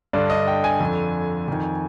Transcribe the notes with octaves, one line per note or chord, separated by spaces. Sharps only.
G2 D3 D5
D#5
G5
G#5
F2 D3
F2 D#3